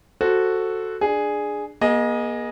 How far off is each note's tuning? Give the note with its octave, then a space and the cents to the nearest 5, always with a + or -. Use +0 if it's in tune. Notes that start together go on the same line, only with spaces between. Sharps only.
F#4 +0 A4 +0 C5 +0
D4 +15 G#4 +0
A#3 +45 G#4 +0 D#5 +0